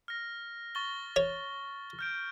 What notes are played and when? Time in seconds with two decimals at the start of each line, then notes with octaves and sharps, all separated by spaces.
0.08 F6 A#6
0.75 C#6 A6 G7
1.16 C#5
1.99 F6 G6 D7